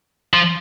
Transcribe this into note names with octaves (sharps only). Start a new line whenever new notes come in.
F3